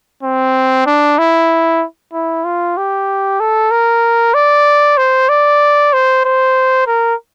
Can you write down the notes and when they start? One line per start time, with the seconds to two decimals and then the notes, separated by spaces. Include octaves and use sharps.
0.23 C4
0.86 D4
1.19 E4
2.13 E4
2.45 F4
2.77 G4
3.40 A4
3.71 A#4
4.34 D5
4.98 C5
5.29 D5
5.93 C5
6.25 C5
6.87 A#4